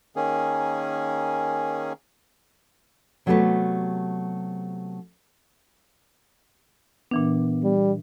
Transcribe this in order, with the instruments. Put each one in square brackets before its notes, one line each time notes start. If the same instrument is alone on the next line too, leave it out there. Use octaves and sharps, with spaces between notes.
[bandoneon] D#3 A#3 C#4 G#4
[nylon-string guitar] C3 F#3 A3 B3 G4 B4
[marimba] A#2 E3 D4 [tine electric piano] B3
[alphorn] G3